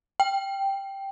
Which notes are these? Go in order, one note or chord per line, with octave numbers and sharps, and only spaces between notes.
G5